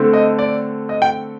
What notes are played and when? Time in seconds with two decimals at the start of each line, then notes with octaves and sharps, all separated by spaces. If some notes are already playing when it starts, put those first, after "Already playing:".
Already playing: D3 A3 C4
0.13 D#5
0.39 D5
0.89 D#5
1.02 G5